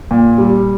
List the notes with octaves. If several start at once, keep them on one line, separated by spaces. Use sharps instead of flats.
A#2
G3